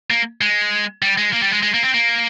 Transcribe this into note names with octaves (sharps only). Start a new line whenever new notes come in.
A#3
G#3
G3
G#3
A#3
G3
G#3
G#3
A#3
C4
A#3